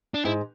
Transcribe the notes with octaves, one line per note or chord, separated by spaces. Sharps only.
D4
G#2 E4